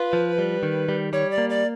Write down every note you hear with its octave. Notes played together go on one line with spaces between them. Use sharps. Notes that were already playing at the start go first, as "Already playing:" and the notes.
Already playing: F4 B4
F3
G3
D#3
G3
G3 C#5
D5
A#3
D5